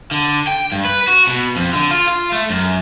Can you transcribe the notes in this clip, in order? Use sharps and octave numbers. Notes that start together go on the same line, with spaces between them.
D3
G5
G2
B4
F#4
B2
F2
D3
F4
F4
A3
F#2